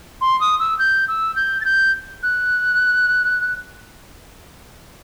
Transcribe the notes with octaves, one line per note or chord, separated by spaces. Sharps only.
C6
D#6
E6
G6
E6
G6
A6
G6
F#6